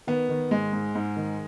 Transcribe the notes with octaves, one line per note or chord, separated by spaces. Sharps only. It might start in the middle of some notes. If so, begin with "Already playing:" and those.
D#3 B3
D#3
G#2 G#3
G#2
G#2
D#3